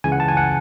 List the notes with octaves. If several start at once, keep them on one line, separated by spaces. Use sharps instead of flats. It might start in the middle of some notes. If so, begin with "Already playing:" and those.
C#2 C#3 E3 G#5
F#5
A5
G#5
F#5